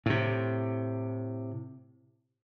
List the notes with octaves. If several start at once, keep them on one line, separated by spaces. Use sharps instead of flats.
A2 C3